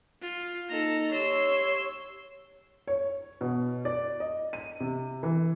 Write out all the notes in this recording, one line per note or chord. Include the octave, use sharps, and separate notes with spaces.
F4
A#3 D#4 A4 D#5 A#5
G4 C#5 C6 E6
C#5
B2
D5
D#5
D#7
C3
E3